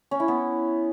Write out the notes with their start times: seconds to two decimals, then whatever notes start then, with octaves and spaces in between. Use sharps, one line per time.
0.11 C#4
0.20 E4
0.28 B3